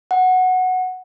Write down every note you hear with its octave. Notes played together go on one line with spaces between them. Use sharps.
F#5